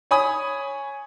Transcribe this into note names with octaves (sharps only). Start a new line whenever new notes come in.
C#5 G#5 B5 D#6